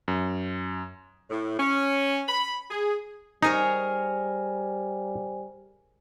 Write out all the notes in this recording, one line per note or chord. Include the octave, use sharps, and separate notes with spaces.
F#2
A2
C#4
B5
G#4
G3 D#4 G#4 A#4 C5 C#5 G#5